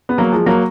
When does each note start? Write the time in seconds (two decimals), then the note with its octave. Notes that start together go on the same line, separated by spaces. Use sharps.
0.09 B3
0.18 F#3 A#3
0.32 F3 G#3
0.46 F#3 A#3